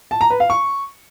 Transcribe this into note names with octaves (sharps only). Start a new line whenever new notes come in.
A5
A#5
B4
F5
C#6